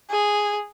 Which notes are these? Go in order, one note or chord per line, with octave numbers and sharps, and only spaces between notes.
G#4